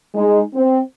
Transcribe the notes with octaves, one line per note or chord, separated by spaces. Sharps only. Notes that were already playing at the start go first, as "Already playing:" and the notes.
G#3 D#4
C4